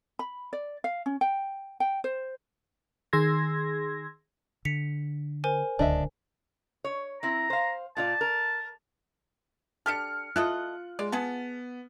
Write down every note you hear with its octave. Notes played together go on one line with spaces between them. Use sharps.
B5
D5
F5
C#4
G5
G5
C5
D#3 G#4 C6 E6 G#6 A#6
D3 B6 C#7 F7
A#4 C5 G#5
D1 C#2 D3 D4 D#5 E5
C#5
C4 E4 A#5
C5 F5
A#2 F4 D5 A5
A#4
D4 G4 A4 F6 C#7
E4 F4 A4 D#5 F#6
G#3 D5
B3 G#4 F#5 A5